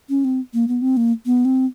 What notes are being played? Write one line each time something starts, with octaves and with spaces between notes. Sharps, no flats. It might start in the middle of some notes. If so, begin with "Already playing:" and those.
C#4
C4
A#3
B3
C4
A#3
B3
C4